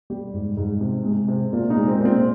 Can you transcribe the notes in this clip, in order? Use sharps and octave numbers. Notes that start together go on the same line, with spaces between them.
G3 G4
G#2
G#2
C3
G#3
C3
A#2
D#4
G#3
C4
A#2 C4